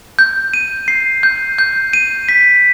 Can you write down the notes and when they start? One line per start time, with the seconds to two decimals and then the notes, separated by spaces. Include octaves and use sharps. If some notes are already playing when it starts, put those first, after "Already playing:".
0.19 G6
0.54 D#7
0.88 C7
1.23 G6
1.59 G6
1.93 D#7
2.29 B6